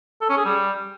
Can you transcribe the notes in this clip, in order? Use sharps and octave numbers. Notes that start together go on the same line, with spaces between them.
A4
C#4
G#4
G3